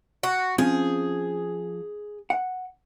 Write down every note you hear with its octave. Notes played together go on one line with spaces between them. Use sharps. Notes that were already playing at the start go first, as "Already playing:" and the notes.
F#4
F3 C4 C#4 G#4
F#5